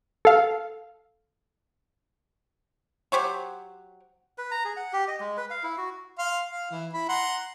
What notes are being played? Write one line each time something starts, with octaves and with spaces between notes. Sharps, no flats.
A4 F5
F#3 G4 C5 C#5
B4
A#5
G#4
F#5
G4
D#5
G#3
B4
F5
E4
F#4
F5 C6
F5
E3 E4
E4 B5
F#5 A#5 C6